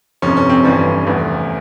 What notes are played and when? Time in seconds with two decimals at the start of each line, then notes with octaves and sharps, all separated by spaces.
0.22 G1 F2 C3 C#4
0.37 C#4
0.49 C4
0.64 G1 G2 E3 C#4
1.06 F1 E2 E3